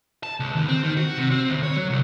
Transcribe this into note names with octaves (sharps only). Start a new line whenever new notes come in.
A5
C#2
D#2
C4
D#3
F#4
C3
C4
D2
C#5
F#3
C2